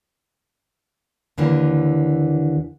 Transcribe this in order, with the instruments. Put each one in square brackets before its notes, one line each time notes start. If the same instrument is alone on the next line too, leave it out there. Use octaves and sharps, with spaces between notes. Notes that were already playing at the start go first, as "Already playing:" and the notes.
[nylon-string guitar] D#2 D3 E3 A#3